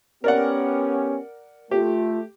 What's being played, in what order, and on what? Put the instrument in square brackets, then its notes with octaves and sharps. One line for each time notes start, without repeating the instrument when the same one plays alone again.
[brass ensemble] B3 C#4 G4 [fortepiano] A#4 D5 F#5
[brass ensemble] A3 [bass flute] F4 [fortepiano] G4